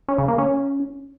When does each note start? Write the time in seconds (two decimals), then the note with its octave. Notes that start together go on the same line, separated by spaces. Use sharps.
0.08 C#4
0.18 C#3
0.28 A#3
0.38 C#4